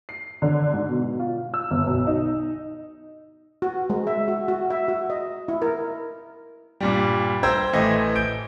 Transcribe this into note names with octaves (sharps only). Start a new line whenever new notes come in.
C7
D3
G#2
B2
F4
E6
G1
B1
D#4
F#4
G#3
E5
F#4
F#4
E5
F#4
D#5
E4
A#4
G2 A#2 G3
C5 G5 A#5 E6 G6 G#6
A1 E3 A3 D#5 G#6
G6 D7